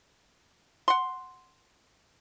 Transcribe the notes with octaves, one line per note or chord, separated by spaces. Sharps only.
F#5 C6